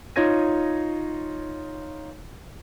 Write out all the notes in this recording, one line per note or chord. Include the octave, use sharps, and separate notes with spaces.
D#4 F4 C#5 G#6 A#6 D#7